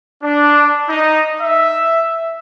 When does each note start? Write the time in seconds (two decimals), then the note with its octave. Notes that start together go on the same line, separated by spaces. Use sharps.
0.22 D4
0.88 D#4
1.41 E5